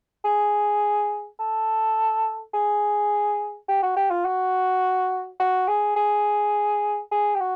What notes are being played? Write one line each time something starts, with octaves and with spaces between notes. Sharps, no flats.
G#4
A4
G#4
G4
F#4
G4
F4
F#4
F#4
G#4
G#4
G#4
G4
F#4